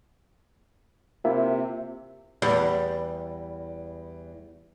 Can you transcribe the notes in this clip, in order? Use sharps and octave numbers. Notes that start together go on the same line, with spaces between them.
C3 A#3 E4 F4 E5
E2 G3